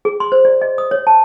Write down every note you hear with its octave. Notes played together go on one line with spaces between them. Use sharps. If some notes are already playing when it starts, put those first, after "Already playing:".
G#4
C6
C5
D5
D#5
D#6
C#5
A5